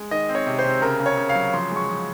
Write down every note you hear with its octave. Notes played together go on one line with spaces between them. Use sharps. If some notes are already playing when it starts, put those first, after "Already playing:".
Already playing: G#3
D#3 D#5
C4
C#5
C3
C5
C3
C#3 A#4
C#3
C#5
C#3
F5
F#3
F3 C6
G#3 C#6
F3